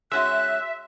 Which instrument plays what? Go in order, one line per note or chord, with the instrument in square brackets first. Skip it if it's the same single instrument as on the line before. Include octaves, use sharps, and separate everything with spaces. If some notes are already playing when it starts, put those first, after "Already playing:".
[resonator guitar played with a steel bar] G#3 C#4 F#4 [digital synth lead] E5 [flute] F#6